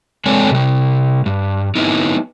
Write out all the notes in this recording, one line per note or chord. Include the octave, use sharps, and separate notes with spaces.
G#3 C4 D4 A4 C#5 G#5
C3 G3
G2
B3 D#4 E4